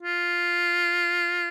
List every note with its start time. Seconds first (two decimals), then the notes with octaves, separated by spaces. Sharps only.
0.03 F4